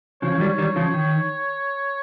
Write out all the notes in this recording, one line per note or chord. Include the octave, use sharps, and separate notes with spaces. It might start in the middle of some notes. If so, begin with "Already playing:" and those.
C#3 F3 C#5
F3
D#3 G3
D#3 G3
C#3 F3
D#3